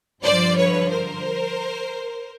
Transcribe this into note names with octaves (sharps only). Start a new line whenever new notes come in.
G2 D3 F3 C5 D5
B4 C#5
A#4 C5